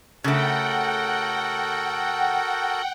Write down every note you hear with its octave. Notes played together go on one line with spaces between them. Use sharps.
C#3 A3 F#4 A4 A#4 F#5 G5